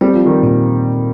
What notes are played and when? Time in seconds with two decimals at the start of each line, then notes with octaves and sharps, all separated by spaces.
0.01 G3 C4
0.13 F3
0.26 D#3 G3
0.43 A#2